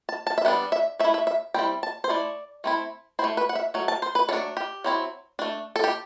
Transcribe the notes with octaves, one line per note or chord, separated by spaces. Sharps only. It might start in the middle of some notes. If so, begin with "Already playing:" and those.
A5
A5
E5
G3 B3 D4 F#5
E5
A3 E4 E5
E5
E5
G3 C4 E4 G5
A5
C5
A3 E4 D5
A3 C4 E4
A3 C4 E4 C5
B4
F#5
E5
F#3 A3
A5
C5
B4
F#3 A3 D4 A4
G4
F#3 C4 E4
A3 D4
A4
G4